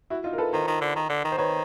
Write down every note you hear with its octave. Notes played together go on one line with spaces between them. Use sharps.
E4 F#4
D#4 F4
A#4
A4 B4
D#3 A#4 C5
D#3
D3
D#3
D3
D#3
C5
D#3 B4 C#5